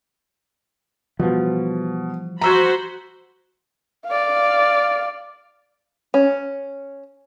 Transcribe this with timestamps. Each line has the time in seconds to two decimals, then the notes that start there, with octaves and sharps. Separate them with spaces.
1.19 B2 E3 F3 G3
2.41 F#4 C5 A#5 B5 E6 G#6
4.06 D5 F5
6.14 C#4